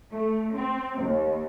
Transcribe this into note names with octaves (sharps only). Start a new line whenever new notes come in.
A3
C4
D#2